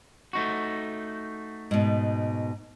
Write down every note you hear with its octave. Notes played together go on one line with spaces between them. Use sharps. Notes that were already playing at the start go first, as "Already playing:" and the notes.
A3 D#4 F#4
G#2 B2